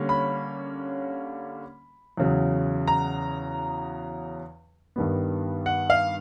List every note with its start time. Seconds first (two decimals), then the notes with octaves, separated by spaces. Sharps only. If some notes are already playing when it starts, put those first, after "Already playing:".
Already playing: D3 G3 A#3 C#4
0.09 B5
2.17 E2 C#3 F#3
2.88 A#5
4.96 G2 D#3 G3 B3
5.66 F#5
5.90 F5